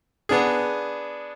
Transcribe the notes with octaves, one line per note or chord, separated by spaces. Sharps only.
B3 D4 G#4